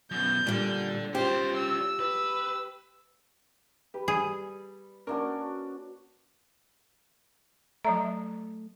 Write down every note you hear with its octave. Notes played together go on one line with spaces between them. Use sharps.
F#2 B2 G6
A#2 G3 D4 A4
C#4 F4 G4 C5
E6
B4
G4 B4
G3 G#4
A#3 C#4 D4 F#4 A#4
F#3 A3 D5 E5 A#5